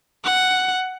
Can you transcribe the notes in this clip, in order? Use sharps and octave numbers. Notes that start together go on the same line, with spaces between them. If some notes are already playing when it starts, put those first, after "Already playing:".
F#5